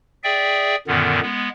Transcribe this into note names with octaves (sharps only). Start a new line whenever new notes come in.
G#4 D5 E5 G5
F#2 A#2 D3 D#3 B3
G#3 B3